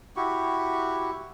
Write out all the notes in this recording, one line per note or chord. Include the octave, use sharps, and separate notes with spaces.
E4 F#4 G4 C#6